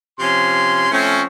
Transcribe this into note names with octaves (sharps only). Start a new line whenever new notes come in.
C3 F3 C#4 C6
F3 A3 C4 C#4